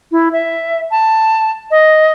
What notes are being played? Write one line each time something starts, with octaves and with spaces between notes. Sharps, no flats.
E4
E5
A5
D#5